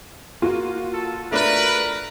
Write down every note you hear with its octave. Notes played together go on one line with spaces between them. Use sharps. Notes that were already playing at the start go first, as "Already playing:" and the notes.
A#3 F4 F#4
A4
A3 D4 A#4 B4 D5